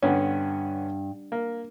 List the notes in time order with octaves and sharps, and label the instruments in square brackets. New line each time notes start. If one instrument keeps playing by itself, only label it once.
[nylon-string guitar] G2 [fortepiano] D3 B3 C#4
[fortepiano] A#3